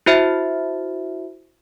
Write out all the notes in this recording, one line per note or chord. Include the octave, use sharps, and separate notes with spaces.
E4 F#4 C5 E5